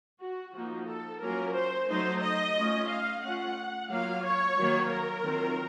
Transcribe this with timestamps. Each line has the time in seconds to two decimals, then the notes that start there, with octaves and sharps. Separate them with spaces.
0.21 F#4
0.54 F3 A#3 D#4 F#4
0.88 A4
1.21 F#3 A#3 C#4 F4 A#4
1.56 C5
1.89 F#3 A3 D#4 C5
2.22 D#5
2.56 A3 C#4 F4
2.89 F5
3.22 A3 C#4 F4 F#5
3.90 F#3 A#3 F4 F5
4.24 C#5
4.57 D#3 F#3 A#3
4.90 A#4
5.24 D#3 F#3 C4 F4